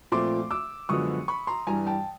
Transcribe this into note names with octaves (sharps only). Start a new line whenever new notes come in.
A#2 F3 A3 C4 C6 D6
D6 E6
F#2 D3 F3 G#3 B3 C#6 D#6
B5 C#6
A#5 C6
G2 E3 G3 G#5 A#5
G5 A5